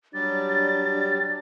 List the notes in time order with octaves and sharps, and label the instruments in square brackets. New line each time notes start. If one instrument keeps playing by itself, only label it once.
[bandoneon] F#3 G3 G4 [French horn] D4 [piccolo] A6